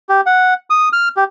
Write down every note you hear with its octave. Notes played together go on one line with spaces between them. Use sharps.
G4
F#5
D#6
F6
G4